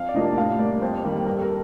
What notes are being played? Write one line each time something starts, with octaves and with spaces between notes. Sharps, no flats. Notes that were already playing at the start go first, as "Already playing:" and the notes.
Already playing: F2 F5
D5
C3 F3 A#3 D4 D#5
A2 F5
G3 A#3 D5
F2 C5
D#3 G3 A#3
G2 A#4
A4
A#4